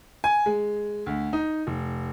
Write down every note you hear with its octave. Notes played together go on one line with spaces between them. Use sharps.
G#5
G#3
D2
D#4
F1